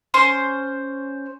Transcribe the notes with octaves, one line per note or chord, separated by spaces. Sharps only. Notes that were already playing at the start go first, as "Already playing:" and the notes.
C#4 C5 C6